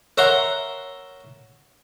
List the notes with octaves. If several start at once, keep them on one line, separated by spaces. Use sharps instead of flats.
A#4 C#5 E5 F#5 A#5 C6